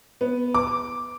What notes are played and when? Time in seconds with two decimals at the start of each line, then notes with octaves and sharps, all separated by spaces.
0.21 B3
0.54 D6